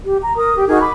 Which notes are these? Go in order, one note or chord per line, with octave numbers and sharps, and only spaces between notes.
G4
A#5
A#4 D#6
G4
D#4 F#4 G#4 A#4
B5 D6